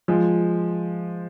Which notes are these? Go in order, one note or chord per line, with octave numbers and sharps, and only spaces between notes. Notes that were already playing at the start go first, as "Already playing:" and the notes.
F3 G#3